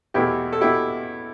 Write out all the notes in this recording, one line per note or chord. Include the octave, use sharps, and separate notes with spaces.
E2 B2 A3 E4 G4
A4
B2 A3 E4 G4